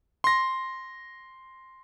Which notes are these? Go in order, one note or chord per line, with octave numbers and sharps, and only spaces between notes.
C6 A#6